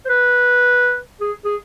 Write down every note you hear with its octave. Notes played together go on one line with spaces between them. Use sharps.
C5
B4
G#4
G#4